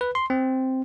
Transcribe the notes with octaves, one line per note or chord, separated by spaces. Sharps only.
B4
C6
C4